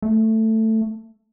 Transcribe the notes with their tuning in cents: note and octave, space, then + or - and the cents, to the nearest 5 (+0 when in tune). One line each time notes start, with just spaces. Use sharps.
A3 +10